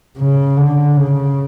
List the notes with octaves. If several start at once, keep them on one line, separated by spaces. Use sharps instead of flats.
C#3
D3
C#3